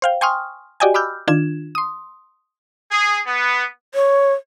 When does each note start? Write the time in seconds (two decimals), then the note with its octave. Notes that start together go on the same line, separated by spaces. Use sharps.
0.02 C5 F5 G5
0.21 G5 G#5 C6 C#6 D#6 F6
0.80 F#4 G4 D5 D#5 G5 G#5
0.94 B5 D6 E6 F6 G6
1.28 D#3 D4 F4 G#6 E7
1.75 C6 D#6
2.91 G#4
3.26 B3
3.95 C#5